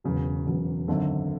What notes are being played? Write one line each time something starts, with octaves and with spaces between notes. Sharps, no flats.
E1 E2 C#3 F#3
E1 E2 C#3 F#3
G#1 F#2 D3